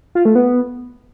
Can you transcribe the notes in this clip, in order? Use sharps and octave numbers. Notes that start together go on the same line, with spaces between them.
F4
A3
B3